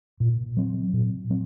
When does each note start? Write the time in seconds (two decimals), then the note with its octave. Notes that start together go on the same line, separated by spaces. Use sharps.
0.20 A#2
0.57 F#3 C4
0.93 A#2
1.30 F#3 C4